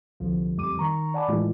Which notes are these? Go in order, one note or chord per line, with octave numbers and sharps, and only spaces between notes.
C2 D3 F3
F2 G3 D6 D#7
D#3 A#5 C#6
D5 F#5 G#5 A5 B5 D6
A2 E3 G#3 E4 F4